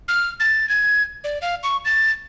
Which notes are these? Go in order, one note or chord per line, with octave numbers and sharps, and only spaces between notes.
F6
A6
G#6
D5
F5
C#6
A6